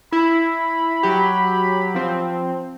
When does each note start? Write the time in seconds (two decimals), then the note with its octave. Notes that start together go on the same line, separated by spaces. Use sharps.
0.13 E4 B5
1.03 F#3 G4
1.94 F3 C4